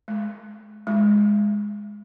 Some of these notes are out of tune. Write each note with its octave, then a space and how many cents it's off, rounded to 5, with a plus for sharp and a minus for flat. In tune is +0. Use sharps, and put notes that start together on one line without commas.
G#3 +30
G#3 -5